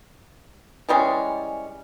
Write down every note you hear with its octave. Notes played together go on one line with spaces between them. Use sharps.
E3 G3 G#3 C#4